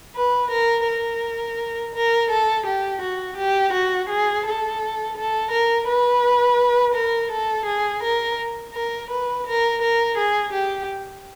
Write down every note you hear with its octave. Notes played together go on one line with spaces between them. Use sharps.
B4
A#4
A#4
A#4
A4
G4
F#4
G4
F#4
G#4
A4
A4
A#4
B4
A#4
A4
G#4
A#4
A#4
B4
A#4
A#4
G#4
G4